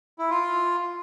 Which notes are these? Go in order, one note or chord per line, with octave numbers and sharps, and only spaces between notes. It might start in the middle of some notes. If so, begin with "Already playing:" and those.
E4
F4